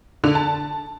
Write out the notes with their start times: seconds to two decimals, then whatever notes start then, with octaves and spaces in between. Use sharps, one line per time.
0.24 D3
0.35 A5